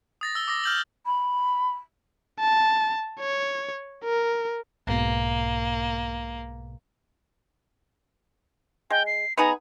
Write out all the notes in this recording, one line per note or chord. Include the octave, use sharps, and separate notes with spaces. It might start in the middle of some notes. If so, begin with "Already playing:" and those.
D#6 A6 A#6
E6 G7
D6 D#6 A#6
F6 G6 F#7
B5
A5
C#5
A#4
B1 G#2 B2 A#3
G#3 G5
C7
B3 D#4 G#4 A#5